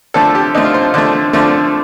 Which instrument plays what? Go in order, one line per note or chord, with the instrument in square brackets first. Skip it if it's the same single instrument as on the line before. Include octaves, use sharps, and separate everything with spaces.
[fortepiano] D3 F3 A3 A4
G4
D3 F3 A3 D#4
F4
C5
D3 F3 A3
D3 F3 A3